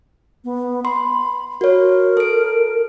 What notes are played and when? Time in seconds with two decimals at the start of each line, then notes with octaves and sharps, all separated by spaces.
0.44 B3
0.85 B5 C6
1.61 F#4 A#4 C#5
2.17 A4 D7